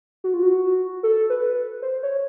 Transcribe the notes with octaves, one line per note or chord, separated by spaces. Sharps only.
F#4
F4
F#4
A4
B4
C5
C#5